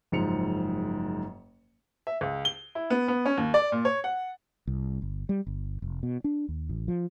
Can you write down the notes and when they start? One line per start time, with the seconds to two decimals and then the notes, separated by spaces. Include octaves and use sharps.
0.12 F#1 G#2 F3 C#7 F7
2.07 E5
2.21 C#2
2.45 G7
2.75 E4
2.90 B3
3.08 B3
3.25 C#4
3.38 D#2
3.54 D5
3.72 A#2
3.85 C#5
4.04 F#5
4.67 C2
5.02 G1
5.29 G3
5.47 G1
5.82 F1
6.03 B2
6.24 D4
6.49 D#2
6.69 A1
6.88 F3